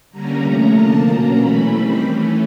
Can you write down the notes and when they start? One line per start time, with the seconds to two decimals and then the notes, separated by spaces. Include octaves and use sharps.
0.11 D3 G3 A#3 C#4 A#5
0.42 C3 F3 A3 C#4 A#5
0.74 D3 F3 A#3 A5
1.06 B2 F#3 A#3 C#4 A#5
1.38 E3 A3 C#4 B5
1.69 D#3 G3 C4
2.02 E3 A3 C#4